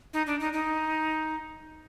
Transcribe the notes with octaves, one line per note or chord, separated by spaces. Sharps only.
D#4
D4
D#4
D#4